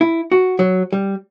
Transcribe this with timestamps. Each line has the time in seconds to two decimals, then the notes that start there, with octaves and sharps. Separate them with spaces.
0.01 E4
0.32 F#4
0.59 F#3
0.93 G3